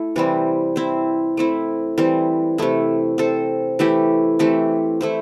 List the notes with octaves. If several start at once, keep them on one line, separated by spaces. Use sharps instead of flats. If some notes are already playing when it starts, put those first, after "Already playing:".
Already playing: A3 E4 A4
C3 E3 G3 C4
C4 E4 C5
A3 C4 E4
E3 G3 C4
C3 A3 E4
C4 A4 C5
E3 A3 E4 G4
E3 A3 C4 G4
A3 E4 C5